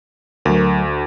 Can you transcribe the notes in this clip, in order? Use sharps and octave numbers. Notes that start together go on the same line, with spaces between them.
D2 F#3 A#4